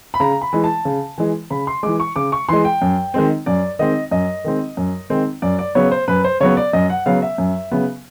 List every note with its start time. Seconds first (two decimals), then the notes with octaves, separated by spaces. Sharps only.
0.14 B5
0.20 C#3 A#5
0.42 B5
0.53 E3 G#3
0.64 A5
0.85 C#3
1.18 E3 G#3
1.50 C#3 B5
1.67 C6
1.83 E3 G#3 D6
2.00 C#6
2.16 C#3 D6
2.32 C#6
2.49 E3 G#3 C6
2.65 G5
2.82 F#2
3.14 D#3 G#3 C4
3.46 F#2 D5
3.79 D#3 G#3 C4 D#5
4.11 F#2 D#5
4.44 D#3 G#3 C4
4.77 F#2
5.10 D#3 G#3 C4
5.42 F#2 D5
5.59 D5
5.75 C#3 F#3 B3 C#5
5.91 C5
6.08 F#2 B4
6.24 C5
6.40 C#3 F#3 B3 C#5
6.57 D5
6.73 F#2 D#5
6.90 F#5
7.06 C#3 F#3 B3 F5
7.22 E5
7.38 F#2
7.71 C#3 F#3 B3